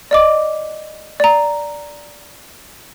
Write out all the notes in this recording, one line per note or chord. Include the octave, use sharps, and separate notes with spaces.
D5 D#5 D6
D5 A#5